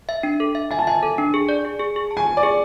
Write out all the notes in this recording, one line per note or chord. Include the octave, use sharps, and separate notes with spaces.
E5
D4
A4
E5
E5 G#5
A5
E5 G#5
A4
D4
G#4
D5
G#4
G#4
G#4
A5
G#5
G#4
D5
G#4